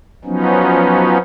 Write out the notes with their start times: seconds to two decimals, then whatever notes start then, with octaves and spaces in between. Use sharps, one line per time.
0.25 F3 F#3 B3 C#4 D#4